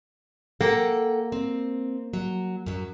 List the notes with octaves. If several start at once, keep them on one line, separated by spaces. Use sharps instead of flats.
A#3 A4 F#5 G5
C4
F#3
F#2 F#3